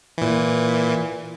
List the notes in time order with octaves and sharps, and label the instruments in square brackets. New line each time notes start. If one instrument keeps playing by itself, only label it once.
[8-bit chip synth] A#2 E3